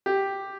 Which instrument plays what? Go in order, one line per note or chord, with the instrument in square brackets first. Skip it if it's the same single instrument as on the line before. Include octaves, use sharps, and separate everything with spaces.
[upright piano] G4